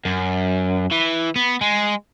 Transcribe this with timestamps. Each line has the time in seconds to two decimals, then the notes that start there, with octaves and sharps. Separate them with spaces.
0.05 F#2
0.91 E3
1.36 B3
1.61 G#3